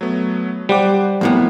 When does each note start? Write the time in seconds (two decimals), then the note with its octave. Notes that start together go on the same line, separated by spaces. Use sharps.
0.01 F#3 A3 B3
0.69 G3 C5 F#5 D6
1.21 F2 A2 A#3 B3 E4